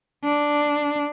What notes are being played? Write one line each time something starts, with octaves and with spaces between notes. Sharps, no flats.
D4